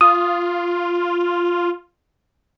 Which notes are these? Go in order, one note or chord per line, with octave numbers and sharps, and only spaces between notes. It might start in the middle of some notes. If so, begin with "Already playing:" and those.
F4 D#6